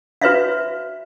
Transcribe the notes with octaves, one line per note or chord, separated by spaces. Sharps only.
F#4 B4 C#5 E5 F5